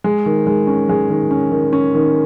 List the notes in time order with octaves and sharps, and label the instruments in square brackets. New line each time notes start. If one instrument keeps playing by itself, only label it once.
[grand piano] G#3
D#3
G#3
C#4
G#3
D#3
C#4
D#3
C#4
D#3